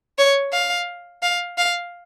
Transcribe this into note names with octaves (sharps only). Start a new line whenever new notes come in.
C#5
F5
F5
F5